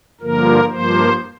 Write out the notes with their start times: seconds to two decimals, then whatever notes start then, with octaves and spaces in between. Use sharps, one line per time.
0.21 G2 D3 F3 A#3 A#4
0.69 G2 F3 A#3 C5